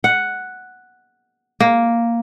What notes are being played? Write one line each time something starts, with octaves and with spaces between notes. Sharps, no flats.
F#5
A#3